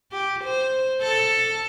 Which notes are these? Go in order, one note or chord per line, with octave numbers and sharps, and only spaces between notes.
G4
C5
A4